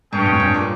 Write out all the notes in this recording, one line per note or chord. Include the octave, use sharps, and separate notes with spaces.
G2 C#4 G#4 C#5 G5
F2
G2
A#2